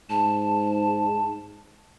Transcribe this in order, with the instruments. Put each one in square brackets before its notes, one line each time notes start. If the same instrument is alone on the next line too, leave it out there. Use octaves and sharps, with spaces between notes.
[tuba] G#2 [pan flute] A5